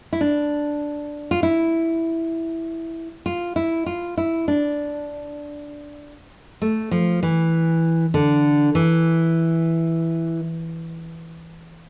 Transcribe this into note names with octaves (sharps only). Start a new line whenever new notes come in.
E4
D4
F4
E4
F4
E4
F4
E4
D4
A3
F3
E3
D3
E3